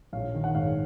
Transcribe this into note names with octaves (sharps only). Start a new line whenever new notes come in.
A#1 C#5 F5
D#3
F#5
G#2 C#5 F5